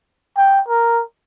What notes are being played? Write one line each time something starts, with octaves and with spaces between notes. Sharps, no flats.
G5
A#4